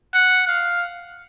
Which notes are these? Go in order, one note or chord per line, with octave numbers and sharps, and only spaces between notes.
F#5
F5